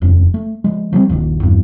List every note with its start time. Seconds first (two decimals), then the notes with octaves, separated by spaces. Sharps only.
0.02 D#1 F2 C#4
0.34 A3
0.64 F3 G#3
0.93 F3 G3 A#3 C4
1.09 D#1 A#1 D#2 D#3
1.43 E2 G2